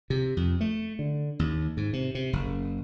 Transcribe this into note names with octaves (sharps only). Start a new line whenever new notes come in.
C3
F2
A3
D3
D#2
G#2
C3
C3
F#1